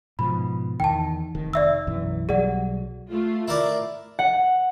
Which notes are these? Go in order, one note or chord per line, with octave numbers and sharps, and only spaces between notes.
G#2 B2 F3 B5
E2 D#3 G5 A5
F1 D#3
D5 E5 E6
B1 F#2 E3
B1 F#3 G3 G#4 D5 F#5
A3 F4
E4 A#4 D5
F#5